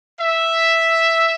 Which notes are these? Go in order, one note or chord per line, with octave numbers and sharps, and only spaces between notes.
E5